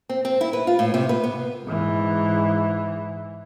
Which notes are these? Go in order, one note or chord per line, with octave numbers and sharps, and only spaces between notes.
C4
C4
E4
B4
F4
A2
C3
B4
B3
G#2 E3